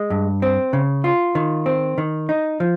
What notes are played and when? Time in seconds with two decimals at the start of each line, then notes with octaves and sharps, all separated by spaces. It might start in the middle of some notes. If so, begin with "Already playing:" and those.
Already playing: G#3
0.10 G2
0.42 C4
0.73 C#3
1.04 F4
1.35 D#3
1.66 C4
1.98 D#3
2.29 D#4
2.60 F3